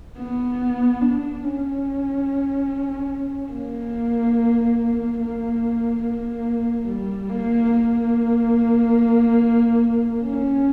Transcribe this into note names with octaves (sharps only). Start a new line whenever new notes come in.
B3
D4
C#4
A#3
A#3
A#3
G3
A#3
A#3
C#4